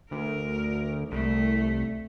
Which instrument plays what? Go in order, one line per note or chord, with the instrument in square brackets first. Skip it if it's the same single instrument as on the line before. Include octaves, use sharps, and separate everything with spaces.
[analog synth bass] D2 [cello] A#4
[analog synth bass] C2 [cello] A3